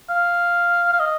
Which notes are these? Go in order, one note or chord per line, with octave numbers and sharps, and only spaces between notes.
F5
F5
D#5